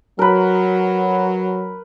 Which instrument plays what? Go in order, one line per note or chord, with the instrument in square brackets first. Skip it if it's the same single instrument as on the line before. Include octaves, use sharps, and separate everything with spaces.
[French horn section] F#3 [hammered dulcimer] A#4 B4